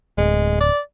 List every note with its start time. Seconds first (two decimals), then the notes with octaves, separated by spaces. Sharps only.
0.18 D1 G#3
0.60 D5